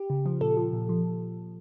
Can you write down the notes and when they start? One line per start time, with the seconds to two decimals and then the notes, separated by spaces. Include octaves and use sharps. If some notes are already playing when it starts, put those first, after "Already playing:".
Already playing: G4
0.10 C#3
0.26 F3
0.41 A#2 A4
0.57 F3
0.73 A#2
0.89 F3